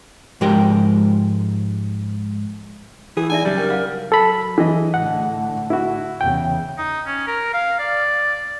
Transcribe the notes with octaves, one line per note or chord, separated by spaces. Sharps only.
G#2 F3 G#3 G4 A#4 G5
E3 E4 G#4
E2 A2 D#4 D5 E5 G#5
F#2 C#3 F#3 G3
A#4 G5
F5 F#5
F#3 A4 B5
E3 G#4 D#5
A2 D3 A3 F#5
E4 F#4
E2 C#3 G5
D#4
C#4
A#4
F5
D5